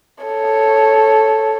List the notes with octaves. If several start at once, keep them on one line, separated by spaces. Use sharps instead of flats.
A4 C#5